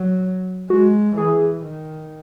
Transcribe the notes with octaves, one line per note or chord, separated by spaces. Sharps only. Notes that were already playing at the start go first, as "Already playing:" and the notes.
Already playing: F#3
G#3 F#4
E3 G#4
D#3